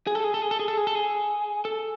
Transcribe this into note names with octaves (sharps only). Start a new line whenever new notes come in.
G#4
A4
G#4
A4
G#4
A4
G#4
A4
G#4
A4
G#4
A4